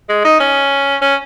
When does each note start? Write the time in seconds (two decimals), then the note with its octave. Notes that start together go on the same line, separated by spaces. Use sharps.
0.09 G#3
0.24 D#4
0.40 C#4
1.01 C#4